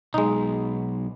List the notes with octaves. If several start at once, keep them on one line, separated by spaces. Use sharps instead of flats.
B1 G#3 D#4